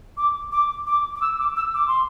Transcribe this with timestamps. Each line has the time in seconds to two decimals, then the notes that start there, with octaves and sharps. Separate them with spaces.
0.17 D6
0.52 D6
0.87 D6
1.16 D6
1.22 E6
1.40 D6
1.56 E6
1.74 D6
1.88 C6